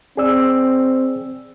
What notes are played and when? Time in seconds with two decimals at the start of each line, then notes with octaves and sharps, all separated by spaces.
0.17 C4 G#4 D5 E6